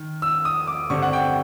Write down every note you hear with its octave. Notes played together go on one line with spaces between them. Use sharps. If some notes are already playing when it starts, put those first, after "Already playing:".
Already playing: D#3
E6
D#6
D6
G2 D3 G3 C4 C#6
F#5
G5